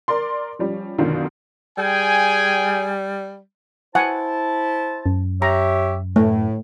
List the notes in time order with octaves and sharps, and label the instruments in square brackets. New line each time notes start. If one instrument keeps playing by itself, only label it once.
[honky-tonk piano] A#4 D5 C6
F3 G3 C#4
F#2 B2 D3 D#3 F#3 F4
[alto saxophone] G3 [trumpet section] G#4 G5 G#5
[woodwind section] E4 C5 A5 [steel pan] F#5 G#5
[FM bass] F#2
[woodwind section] G4 C#5 E5 [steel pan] A#5
[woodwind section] A2 [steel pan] A3